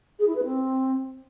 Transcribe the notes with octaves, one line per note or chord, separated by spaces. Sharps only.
G#4
E4
B4
C4